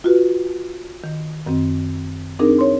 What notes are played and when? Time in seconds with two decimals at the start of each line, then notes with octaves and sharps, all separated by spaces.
0.04 F4 F#4 B4
1.04 D#3
1.46 F#2 D#3 C4
2.39 C4 D4 D#4 G#4 A#4
2.59 C#5 C6